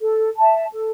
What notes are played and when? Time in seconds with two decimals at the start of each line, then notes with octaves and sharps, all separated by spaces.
0.01 A4
0.37 E5 A5
0.72 A4